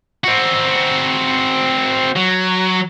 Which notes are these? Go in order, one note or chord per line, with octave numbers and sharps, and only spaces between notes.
C4 F#4
F#3